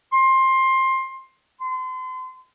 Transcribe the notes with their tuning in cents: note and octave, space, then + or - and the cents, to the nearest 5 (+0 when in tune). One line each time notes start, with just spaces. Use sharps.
C6 +20
C6 -35